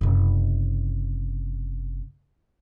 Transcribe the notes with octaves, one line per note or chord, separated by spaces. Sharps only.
F#1 C3